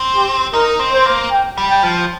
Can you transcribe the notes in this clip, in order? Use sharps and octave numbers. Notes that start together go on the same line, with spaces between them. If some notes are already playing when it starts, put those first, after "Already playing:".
Already playing: C4
G4
D#4 A#4
C4
C5
A#3
G5
G3
G5
F3